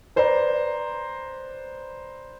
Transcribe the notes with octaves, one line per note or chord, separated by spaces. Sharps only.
B4 C5 D5 A#5 C6